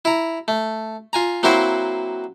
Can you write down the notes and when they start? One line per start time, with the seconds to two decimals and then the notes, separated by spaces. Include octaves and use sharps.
0.05 E4 A#5
0.48 A3
1.13 F4 G#5 A#5
1.43 F#3 A#3 C4 E4 F#4 C5